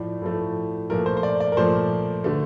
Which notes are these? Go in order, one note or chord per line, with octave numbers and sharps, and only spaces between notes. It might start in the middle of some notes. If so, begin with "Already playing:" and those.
Already playing: A2 F3 A3 D5
A2 F3 A3
A#2 F3 A3 A#4
C5
C5
D5
D5
A#4
A#2 F3 A3 C5
D3 A3